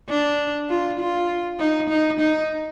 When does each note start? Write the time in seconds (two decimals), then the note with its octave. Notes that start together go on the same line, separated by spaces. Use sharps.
0.09 D4
0.70 F4
0.99 F4
1.60 D#4
1.89 D#4
2.20 D#4